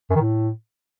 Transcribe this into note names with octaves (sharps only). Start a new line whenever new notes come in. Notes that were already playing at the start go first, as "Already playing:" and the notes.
F#2
D#3
A2